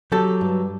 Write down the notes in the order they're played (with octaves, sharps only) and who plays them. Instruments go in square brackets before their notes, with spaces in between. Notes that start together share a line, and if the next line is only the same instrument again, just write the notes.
[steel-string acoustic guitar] F#3 [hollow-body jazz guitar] G4 A4
[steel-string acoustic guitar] G2